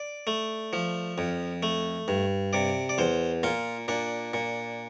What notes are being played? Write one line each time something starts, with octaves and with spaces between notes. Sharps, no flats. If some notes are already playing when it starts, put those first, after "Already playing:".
Already playing: D5
A3
F3
F2
A3
G2
C3 D5
D5
E2 C5
A#2 F4
A#2 D4
A#2